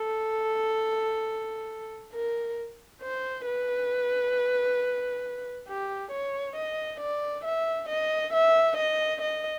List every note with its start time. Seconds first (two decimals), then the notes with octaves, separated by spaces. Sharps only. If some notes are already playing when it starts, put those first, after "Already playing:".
Already playing: A4
2.14 A#4
3.02 C5
3.47 B4
5.68 G4
6.12 C#5
6.56 D#5
7.00 D5
7.45 E5
7.89 D#5
8.33 E5
8.77 D#5
9.22 D#5